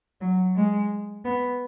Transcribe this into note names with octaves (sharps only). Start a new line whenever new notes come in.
F#3
G#3
B3